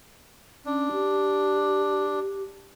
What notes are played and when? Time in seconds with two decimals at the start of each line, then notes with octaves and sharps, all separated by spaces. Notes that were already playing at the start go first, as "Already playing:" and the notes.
0.66 C#4 D4
0.92 G4